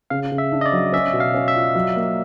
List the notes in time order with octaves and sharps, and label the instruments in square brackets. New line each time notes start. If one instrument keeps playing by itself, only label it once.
[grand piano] C#3 [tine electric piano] F5
[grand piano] C#3
[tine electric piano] E5
[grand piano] D4
[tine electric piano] D#5
D5
[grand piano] F#3
[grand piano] C#4 [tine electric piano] E5
[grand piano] B2
[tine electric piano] F5
[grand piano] C#4
[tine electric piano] E5
[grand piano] F4
F#3
A#3